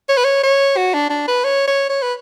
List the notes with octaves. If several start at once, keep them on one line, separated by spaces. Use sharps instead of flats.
C#5
B4
C#5
C#5
F#4
D4
D4
B4
C#5
C#5
C#5
B4